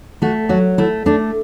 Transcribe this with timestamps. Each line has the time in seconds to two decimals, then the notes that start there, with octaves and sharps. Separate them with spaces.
0.22 A3 F#4
0.49 F#3 F#4
0.78 A3 E4
1.06 A3 D4